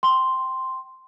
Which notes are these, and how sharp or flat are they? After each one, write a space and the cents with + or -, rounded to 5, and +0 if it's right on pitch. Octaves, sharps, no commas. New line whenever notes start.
G5 -15 C6 +0